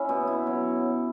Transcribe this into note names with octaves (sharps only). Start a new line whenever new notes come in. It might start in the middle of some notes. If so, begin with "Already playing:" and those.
Already playing: C#4 E4
B2
E4
F#3